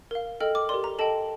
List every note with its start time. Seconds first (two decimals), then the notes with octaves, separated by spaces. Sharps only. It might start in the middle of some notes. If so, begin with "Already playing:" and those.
0.11 A#4 F5
0.40 A4 D#5 G5 F6
0.55 D6
0.69 G4 A#4 D5 C6
0.84 A#5
0.99 A4 D#5 G5 A5